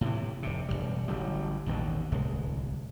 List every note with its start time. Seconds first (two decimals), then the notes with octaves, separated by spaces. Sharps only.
0.01 A2 C3 E3
0.43 F1 C3
0.68 E1 C2 G3
1.08 A1 D3 F#3 G3
1.66 A1 D#2 B2 D3
2.12 D1 C2 G#3